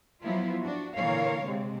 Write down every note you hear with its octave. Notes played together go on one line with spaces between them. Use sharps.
F3 F#3 B3 E4 F4
D4 F#4
A#2 D3 E3 A#4 C#5 F5
C3 G#3 C4